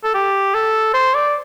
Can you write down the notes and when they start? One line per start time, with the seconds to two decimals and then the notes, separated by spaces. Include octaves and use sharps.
0.04 A4
0.14 G4
0.54 A4
0.94 C5
1.15 D5